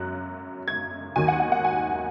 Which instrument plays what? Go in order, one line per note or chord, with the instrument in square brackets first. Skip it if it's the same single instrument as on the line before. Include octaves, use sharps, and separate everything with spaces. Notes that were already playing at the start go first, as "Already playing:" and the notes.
Already playing: [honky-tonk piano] F#2 F#3 F#6
G#6
D#2 D#3 F#3 G#5
F#5
F#5
F#5
G#5